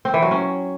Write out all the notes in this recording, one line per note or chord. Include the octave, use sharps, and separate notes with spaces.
C4
E3
F#3
C#4